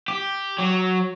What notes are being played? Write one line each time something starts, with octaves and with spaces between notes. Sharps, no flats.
G4
F#3